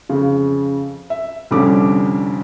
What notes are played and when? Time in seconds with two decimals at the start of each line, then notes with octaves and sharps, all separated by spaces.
0.09 F2 C#3
1.10 E5
1.51 C2 F2 D3 G3 C#4 D6